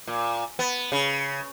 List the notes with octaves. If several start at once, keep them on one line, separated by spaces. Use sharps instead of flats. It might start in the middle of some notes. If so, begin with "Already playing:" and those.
A#2
B3
C#3